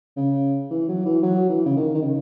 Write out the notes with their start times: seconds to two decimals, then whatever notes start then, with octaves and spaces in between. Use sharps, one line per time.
0.17 C#3
0.71 E3
0.88 F#3
1.05 E3
1.22 F#3
1.49 E3
1.66 C#3
1.76 D#3
1.95 D#3
2.02 C#3